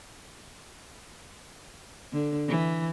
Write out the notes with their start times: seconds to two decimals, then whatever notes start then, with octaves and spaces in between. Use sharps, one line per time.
2.13 D3
2.48 E3